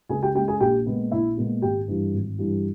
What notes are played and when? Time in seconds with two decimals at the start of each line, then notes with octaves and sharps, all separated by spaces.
0.09 C#2 G#4 G#5
0.23 G4 G5
0.35 C#3 G#3 G4 G5
0.48 G#4 G#5
0.60 A#1 G4 G5
0.86 A#2 G#3 B3
1.11 A#1 E4 E5
1.37 A#2 G#3 B3
1.62 G#1 G4 G5
1.88 G2 E3 G3
2.13 G#1
2.38 G2 E3 G3